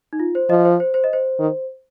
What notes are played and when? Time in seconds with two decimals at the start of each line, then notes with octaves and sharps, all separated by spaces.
0.13 D#4
0.20 F4
0.35 C5
0.49 F3 D#5
0.65 C5
0.80 C5
0.94 C5
1.04 D#5
1.13 C5
1.39 D#3